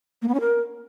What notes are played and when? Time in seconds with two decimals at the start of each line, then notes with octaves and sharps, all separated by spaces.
0.22 A#3
0.28 B3
0.34 C#4
0.40 A#4